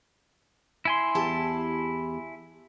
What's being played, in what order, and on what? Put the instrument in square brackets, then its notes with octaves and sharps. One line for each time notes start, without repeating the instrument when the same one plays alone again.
[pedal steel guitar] E4 G#5 C6
[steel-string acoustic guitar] E2 G4 A5